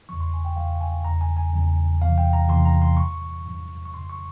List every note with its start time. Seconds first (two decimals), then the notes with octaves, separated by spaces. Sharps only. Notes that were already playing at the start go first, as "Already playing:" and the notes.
0.09 E2 C#3 F3 C#6
0.20 C6
0.34 G#5
0.45 G5
0.56 E2 C#3 F3 F5
0.81 G#5
1.05 E2 C#3 F3 A#5
1.21 G#5
1.37 G#5
1.53 E2 C#3 F3
2.01 E2 C3 E3 F5
2.18 G5
2.33 A#5
2.49 E2 C3 E3 C6
2.65 A#5
2.82 C6
2.97 G2 F3 C#6
3.46 G2 F3
3.85 C#6
3.94 F2 C#3 F3 C6
4.10 C#6